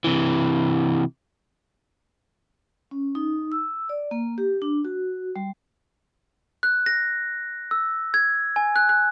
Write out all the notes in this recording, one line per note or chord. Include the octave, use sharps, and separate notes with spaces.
C3 E3
C#4
D#4
E6
D5
A#3
G4
D4
F#4
G3
F#6
A#6
E6
G#6
G#5
F#6
F#6